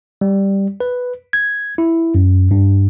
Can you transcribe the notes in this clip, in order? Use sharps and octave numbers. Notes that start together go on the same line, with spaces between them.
G3
B4
G#6
E4
F#2
G2